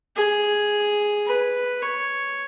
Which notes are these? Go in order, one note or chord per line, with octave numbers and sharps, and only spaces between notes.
G#4
B4
C#5